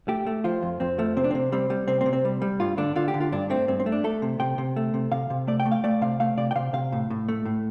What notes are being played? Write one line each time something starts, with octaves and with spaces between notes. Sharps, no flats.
A3 G4
A3
F3 F4
F2
F2 C4
F3 A3
C3 C4
D4
C3 C4
G3 C4
G3
C3 C4
C4
C3
C4
G3
G3
G2 F4
D3 D4
D3 F4
G4
D3
F4
G2 D4
A3 C4
G2 C4
C4
A3
D4
A3 A4
C3
C3 G5
C3
A3
C3
C3 F5
C3
A3 D5
G5
A3
F5
A3 D5
C3 F5
A3 F5
C3 D5
G5
C3 F5
C3 F5
A2
A2
A3
A2